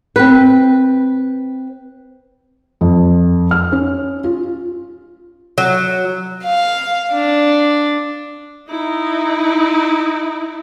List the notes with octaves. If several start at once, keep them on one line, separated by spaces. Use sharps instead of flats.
C4 B4
F2
F6
C#4
F4
F#3
F5
D4
D#4 E4